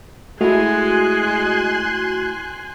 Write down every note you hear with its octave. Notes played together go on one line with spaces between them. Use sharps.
G#3 A3 E4 F#4 G#5 C6 F#6